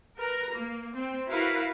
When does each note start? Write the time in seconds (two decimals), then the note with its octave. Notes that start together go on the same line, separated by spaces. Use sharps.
0.18 A#4 B4 A#5
0.52 A#3
0.95 C4
1.28 E4 F#4 A#4 B4 F5